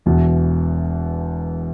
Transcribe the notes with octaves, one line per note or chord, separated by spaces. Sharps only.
E1 E2 B2